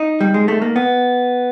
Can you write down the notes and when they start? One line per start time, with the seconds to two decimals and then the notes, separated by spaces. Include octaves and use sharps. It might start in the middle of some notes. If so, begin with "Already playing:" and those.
Already playing: D#4
0.21 G3
0.34 G#3
0.48 A3
0.62 A#3
0.76 B3